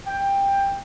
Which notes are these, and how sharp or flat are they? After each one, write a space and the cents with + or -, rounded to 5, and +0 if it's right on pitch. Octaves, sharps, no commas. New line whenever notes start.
G5 +15